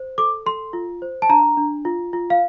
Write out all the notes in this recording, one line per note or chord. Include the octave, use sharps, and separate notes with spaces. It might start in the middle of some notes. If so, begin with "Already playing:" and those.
Already playing: C5
A4 D6
A4 C6
F4
C5
A5
D4 A#5
D4
F4
F4
F5